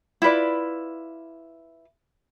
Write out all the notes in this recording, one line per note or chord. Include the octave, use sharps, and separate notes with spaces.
E4 F4 B4 D5